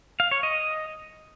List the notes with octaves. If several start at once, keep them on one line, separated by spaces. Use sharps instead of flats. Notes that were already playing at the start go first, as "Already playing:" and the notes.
F5
C#5
D#5